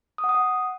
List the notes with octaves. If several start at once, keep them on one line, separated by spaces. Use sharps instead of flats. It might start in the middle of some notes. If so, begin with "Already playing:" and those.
D#6
F#5
D#6
F#5